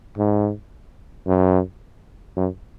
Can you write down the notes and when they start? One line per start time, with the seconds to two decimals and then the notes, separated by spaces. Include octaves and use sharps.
0.18 G#2
1.27 F#2
2.37 F#2